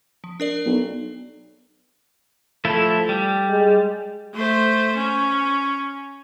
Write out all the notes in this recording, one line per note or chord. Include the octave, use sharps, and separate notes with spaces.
F3
D4 A#4 D5
B1
F3 A3 E4 A4
G3
G#3
A3 C5
C#4